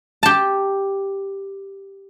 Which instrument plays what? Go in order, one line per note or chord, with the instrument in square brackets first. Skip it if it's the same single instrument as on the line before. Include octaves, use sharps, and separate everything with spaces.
[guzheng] G4 A5